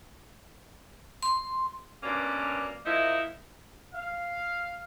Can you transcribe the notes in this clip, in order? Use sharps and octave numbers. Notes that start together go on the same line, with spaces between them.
C6
G2 B2 A#3 C#4 D5
F3 A#3 D#4 E4
F5